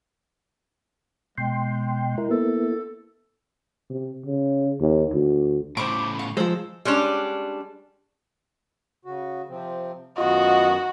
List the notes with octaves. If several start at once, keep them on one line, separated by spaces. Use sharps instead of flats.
B2 G#3 G5 C6
E4 A#4
A#3 B3 E4 A4
C3
C#3
D#2
D2
A2 C#3 C5 B5 C#6 D6
F5 C#6
F3 G#3 A4 C5 E6
G3 G#3 C#4 D4
C#3 F#4
C3 F3 C4
F#2 D#3 B3 F4 F#4 D#5